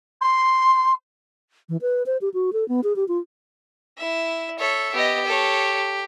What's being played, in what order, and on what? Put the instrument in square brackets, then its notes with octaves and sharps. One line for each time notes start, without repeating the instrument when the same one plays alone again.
[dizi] C6
[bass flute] E3
B4
C5
G4
F#4
A4
B3
G#4
G4
F4
[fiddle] E4 E5
[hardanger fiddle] A4 E5 [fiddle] C#5
[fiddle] B3 D#5 [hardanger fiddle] G4
[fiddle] A4 C#5